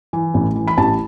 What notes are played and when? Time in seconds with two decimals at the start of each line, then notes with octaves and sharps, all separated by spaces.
0.13 E3
0.34 A1
0.56 E3
0.68 B5
0.77 A1 A5